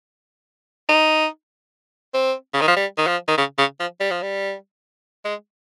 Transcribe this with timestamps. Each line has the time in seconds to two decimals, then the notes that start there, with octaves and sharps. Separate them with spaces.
0.89 D#4
2.14 C4
2.54 C#3
2.61 D#3
2.68 F3
2.76 G3
2.98 D#3
3.07 F3
3.28 D#3
3.38 C#3
3.58 C#3
3.80 F3
4.00 G3
4.11 F3
4.22 G3
5.25 G#3